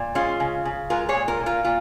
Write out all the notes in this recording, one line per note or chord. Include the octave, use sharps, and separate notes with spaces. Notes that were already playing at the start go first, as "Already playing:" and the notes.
Already playing: A#2
G#3 C#4 F4
C#3
C#3
G#3 F4 A#4
G#4 C#5
A#2
F4 A#4
A#2
F4 A#4
A#2 F4